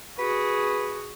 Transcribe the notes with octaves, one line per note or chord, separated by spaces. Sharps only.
F#4 G#4 B4